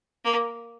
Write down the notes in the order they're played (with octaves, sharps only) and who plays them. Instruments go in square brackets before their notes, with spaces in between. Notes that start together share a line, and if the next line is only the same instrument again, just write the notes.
[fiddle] A#3